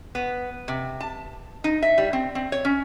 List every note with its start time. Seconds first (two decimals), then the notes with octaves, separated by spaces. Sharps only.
0.15 B3
0.68 C3
1.01 A5
1.64 D#4
1.83 E5
1.98 G3
2.13 C4
2.35 C4
2.52 C#5
2.65 C#4